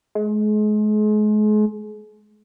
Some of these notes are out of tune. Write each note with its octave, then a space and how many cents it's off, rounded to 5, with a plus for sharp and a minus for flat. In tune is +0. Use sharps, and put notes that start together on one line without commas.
G#3 +35